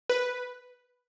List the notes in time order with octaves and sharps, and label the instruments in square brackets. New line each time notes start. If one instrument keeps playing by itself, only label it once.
[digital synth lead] B4